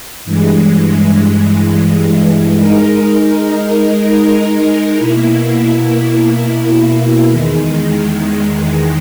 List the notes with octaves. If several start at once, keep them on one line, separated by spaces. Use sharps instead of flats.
G2 E3 G#3
G#3 D#4 A#4
B2 A#3 E4
E2 D#3 G#3